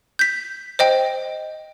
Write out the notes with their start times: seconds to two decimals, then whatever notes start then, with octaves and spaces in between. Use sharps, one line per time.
0.19 G6 B6
0.79 C5 D#5 G5